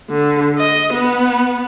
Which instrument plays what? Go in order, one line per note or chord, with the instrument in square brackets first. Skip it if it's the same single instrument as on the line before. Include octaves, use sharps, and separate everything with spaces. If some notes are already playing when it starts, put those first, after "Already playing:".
[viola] D3
D#5
B3